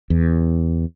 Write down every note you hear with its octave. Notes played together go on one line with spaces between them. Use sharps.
E2